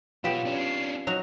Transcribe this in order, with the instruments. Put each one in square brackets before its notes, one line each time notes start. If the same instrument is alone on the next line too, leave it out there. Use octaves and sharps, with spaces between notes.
[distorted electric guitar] B2 [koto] F#3 B3 G4 [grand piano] F4 [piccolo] E7
[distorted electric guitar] C#4 D4
[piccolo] C7
[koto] F#3 D#4 F#4 [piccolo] F7